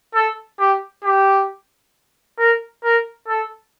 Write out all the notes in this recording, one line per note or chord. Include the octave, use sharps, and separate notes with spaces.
A4
G4
G4
A#4
A#4
A4